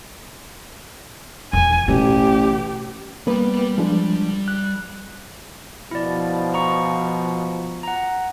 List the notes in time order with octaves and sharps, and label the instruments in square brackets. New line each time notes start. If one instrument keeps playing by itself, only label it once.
[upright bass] E1 [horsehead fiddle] G#5
[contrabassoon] A1 [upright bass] B2 [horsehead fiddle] G4
[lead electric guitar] G3 G5 [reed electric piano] A#3 B3 B4
[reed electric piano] F3 G#3 D4
F#6
[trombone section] B2 F3 [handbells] E4 D5
[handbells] A#5 C#6 C#7
F#5 A#5